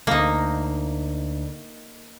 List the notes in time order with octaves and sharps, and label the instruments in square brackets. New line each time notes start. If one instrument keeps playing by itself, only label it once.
[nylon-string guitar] D2 F5 [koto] A#3 D#4